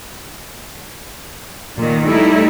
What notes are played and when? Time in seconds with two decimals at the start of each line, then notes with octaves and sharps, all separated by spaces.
1.77 A#2 D#3
2.07 G3 A3 D#4 E4